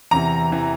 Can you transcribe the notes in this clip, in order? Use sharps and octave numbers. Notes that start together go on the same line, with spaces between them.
E2 C3 E3 A#5
C3 E3